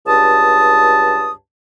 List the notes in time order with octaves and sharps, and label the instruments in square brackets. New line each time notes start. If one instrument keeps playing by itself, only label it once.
[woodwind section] C#2 G2 A5 D#6